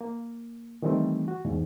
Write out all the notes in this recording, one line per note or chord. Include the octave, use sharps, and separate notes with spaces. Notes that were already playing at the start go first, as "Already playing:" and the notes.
A#3
D#3 E3 G3 A3 C4
F#4
E2 G#2